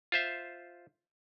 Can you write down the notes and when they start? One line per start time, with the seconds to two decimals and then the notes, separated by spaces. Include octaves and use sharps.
0.12 F4 C5 E5